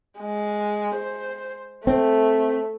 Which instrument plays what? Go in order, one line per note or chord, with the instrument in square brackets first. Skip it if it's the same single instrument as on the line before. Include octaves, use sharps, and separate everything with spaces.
[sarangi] G#3
C5
[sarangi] A3 [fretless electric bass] C4